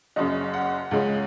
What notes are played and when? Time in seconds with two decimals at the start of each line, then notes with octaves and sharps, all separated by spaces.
0.16 F#1 F#2 C#3 D#5
0.54 F#5
0.91 C#2 C#3 G#3 C#4